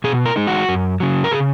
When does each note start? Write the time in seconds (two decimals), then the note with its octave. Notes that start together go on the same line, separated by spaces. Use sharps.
0.04 B2 G#4
0.26 A#4
0.36 G#3 D#4
0.47 F#4
0.69 F#2
1.00 C#3 F#3
1.24 A#4
1.31 C#3 G#4